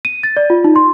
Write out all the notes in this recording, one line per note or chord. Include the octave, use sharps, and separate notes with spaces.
D#7
A6
D5
F4
D#4
C6